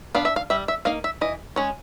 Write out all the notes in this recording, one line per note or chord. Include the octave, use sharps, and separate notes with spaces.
B3 D4 F5
E5
F5
G3 E5
E5
A#3 D#4 F5
E5
E3 D#5
G#3 C#4 C#5